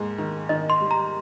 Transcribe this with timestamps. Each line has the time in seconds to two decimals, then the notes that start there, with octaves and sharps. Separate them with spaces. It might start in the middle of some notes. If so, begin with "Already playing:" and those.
Already playing: D#2 G#2
0.18 D#3
0.49 D#3 D#5
0.70 C6
0.81 G3
0.91 A#5